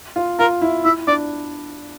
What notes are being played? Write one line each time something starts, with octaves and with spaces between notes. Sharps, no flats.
F4
F4 A#4
E4
E4 E5
D4 D5